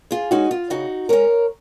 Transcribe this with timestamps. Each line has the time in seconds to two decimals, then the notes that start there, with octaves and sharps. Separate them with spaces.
0.11 F4 G#4
0.31 G#3 C#4 D#4 F#4
0.51 F4
0.70 C#3 D#4 F#4
1.09 G#3 C#4 A#4 C#5